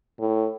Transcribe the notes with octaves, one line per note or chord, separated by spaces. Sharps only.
A2